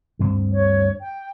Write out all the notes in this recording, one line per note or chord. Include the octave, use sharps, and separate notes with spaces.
D2 G2 C4
C#5
G5